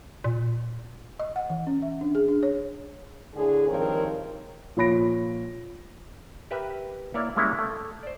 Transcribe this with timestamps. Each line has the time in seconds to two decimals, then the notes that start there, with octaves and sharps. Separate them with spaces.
0.24 A#2
1.19 D#5
1.36 F#5
1.50 E3
1.67 C#4
1.82 E5
2.01 D4
2.15 G#4
2.28 D4
2.43 C#5
3.35 A2 D3 G#4
3.68 G2 D#3 F3 C4 A#4 C#5
4.77 A#2 F3 C#5 B5 A#6 D7
6.51 G4 A#4 B4 E5
7.14 A#3 E4 C#5 D5
7.36 G3 G#3 A#3 C#4 E4 C#5
7.59 A3
8.03 C5 D5